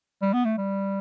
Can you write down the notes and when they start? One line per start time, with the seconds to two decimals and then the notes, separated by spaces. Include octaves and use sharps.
0.22 G3
0.33 B3
0.45 A3
0.58 G3